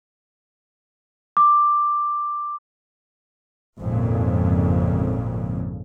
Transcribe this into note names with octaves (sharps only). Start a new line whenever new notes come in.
D6
G#1 F2 A#2 C#3